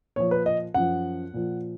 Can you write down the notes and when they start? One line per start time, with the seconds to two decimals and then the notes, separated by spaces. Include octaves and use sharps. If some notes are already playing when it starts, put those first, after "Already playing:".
0.16 A#2 F3 C#5
0.31 B4
0.46 D#5
0.74 F#2 F3 F#5
1.33 A#2 F3